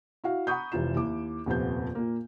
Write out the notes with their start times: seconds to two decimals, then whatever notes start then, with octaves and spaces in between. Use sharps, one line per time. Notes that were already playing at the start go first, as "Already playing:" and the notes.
0.24 E4 F#4 F5
0.47 F#5 A#5 B5 C#6 D#6 G6
0.72 F1 C3 E3 F4 A#5 E7
0.96 D#2 E4 D6
1.46 D#1 F2 C3 B3 F4 G6
1.95 A#2 A#3